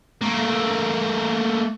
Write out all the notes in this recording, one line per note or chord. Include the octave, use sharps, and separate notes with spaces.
A3 A#3